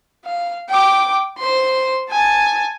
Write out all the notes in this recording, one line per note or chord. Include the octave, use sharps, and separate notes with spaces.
F5
G5 D6
C5 C6
G#5 A5